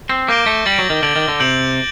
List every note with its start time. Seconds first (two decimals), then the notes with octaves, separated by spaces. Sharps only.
0.09 C4
0.28 A#3 D6 G6 A#6 D7 G7
0.46 A3
0.65 G3 A6 D7 F#7
0.79 F#3
0.90 D#3
1.03 D3 A6 D7 F#7
1.16 D#3
1.28 D3
1.40 C3 G6 D7 F#7